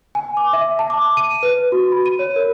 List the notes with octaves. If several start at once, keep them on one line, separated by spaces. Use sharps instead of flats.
G#5
D6
E5
A5
D6
D#7
B4
F#4
B5
D#7
C#5
A#4